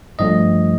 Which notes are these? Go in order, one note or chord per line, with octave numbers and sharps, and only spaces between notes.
G2 F3 A3 D#5